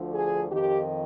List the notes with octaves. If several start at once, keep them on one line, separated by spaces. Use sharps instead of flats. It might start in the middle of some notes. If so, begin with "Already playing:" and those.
Already playing: D2 D3 F3
G#4
F2 D#3 G4